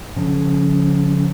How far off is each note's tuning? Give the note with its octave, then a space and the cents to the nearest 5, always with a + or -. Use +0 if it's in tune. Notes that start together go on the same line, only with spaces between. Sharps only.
D3 -45 F3 +35 C#4 +0